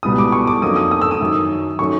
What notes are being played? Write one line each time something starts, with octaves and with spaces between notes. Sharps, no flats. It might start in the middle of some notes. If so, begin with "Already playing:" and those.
C#2 B2 G3 B3 E4 D#6
D6
C#6
D6
F2 D3 F#3 A#3 D#4 D#6
D#6
D#6
E6
D#6
F#2 D#3 F#3
D#3 F#3 A3 C#4 C#6